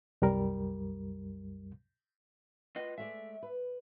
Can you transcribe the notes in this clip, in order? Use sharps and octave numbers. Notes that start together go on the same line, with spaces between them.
C2 F#2 G3 A#4
F4 B4 D#5
G#3 A3 D5 E5
B4